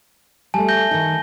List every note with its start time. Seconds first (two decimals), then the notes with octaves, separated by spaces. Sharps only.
0.54 G3 A3 G#5 A5
0.69 G6 A#6 G7
0.91 D#3 D#4